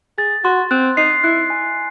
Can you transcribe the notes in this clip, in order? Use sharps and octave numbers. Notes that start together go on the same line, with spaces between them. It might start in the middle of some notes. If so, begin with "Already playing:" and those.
G#4 A6
F#4 C6
C4 F#6
D#4 C7
E4 F#6
G#5